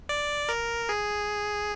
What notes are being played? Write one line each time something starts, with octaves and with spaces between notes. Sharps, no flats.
D5
A#4
G#4